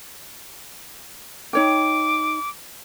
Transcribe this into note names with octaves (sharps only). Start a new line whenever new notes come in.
D#4 C#5 G5 D6